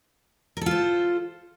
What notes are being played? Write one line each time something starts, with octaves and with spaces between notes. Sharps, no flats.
F4 A4 A#4 C5